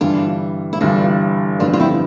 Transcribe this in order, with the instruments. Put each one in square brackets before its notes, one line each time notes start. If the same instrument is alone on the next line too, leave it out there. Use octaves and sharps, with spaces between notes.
[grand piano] G1 G2 E3 G3 [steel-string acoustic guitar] D4 F4
[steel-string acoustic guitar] E4
[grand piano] G1 G2 E3 G3 [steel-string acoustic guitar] D4 F4
[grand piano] G1 F2 D3 G3 B3 [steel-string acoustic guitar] D4 F4
[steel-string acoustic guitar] F4
C4 E4